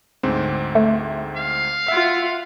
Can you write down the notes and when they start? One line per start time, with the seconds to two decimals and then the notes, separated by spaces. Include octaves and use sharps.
0.23 D2 G#2 C4
0.75 A3
1.36 F5
1.88 F4 E5 F#5